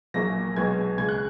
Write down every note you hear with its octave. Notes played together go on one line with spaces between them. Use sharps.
A#1 A#2 F#3 A#3 A#6
B1 B2 G#3 B3 G#6
C#2 C#3 G#3 G#6
F#6